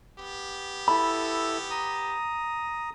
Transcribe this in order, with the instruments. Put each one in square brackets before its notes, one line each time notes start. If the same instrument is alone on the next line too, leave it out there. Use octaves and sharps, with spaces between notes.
[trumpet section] B3 G4
[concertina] E4 A4 E6 [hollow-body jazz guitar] B5
[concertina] A#5 D#6